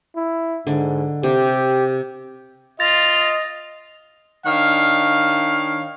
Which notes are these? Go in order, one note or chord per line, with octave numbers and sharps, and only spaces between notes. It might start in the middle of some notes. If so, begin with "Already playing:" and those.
E4
G#2 D3
C3 G4
F4 D#5 A6 A#6 F7
D#3 D4 C#5 F5